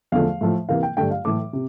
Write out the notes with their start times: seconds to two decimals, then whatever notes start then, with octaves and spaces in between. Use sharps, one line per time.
0.12 E2 D3 F3 A3 F5
0.41 A2 F3 A3
0.69 C3 E3 A#3 F5
0.83 G5
0.97 G2 D3 A3 G5
1.11 F5
1.25 A2 E3 A3 D6
1.53 C3